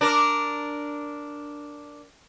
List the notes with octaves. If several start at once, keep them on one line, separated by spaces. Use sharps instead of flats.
D4 A#4